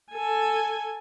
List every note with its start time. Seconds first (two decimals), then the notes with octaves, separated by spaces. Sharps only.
0.11 A4 G#5